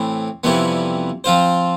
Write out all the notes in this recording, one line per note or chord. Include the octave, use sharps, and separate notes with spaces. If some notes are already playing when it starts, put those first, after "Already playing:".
Already playing: A2 E3 A3 C4
F2 C3 E3 G3 B3
F3 C4 F4 C5